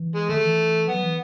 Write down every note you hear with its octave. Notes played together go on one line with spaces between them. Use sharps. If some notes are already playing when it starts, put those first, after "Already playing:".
Already playing: E3
G#3
D#3 A3
E3
F#3 B3
E3